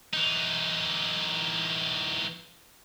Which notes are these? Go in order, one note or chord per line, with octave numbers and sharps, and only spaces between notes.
E3 D#4